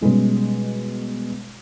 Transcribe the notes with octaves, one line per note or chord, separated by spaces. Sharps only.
B2 G3 G#3 C#4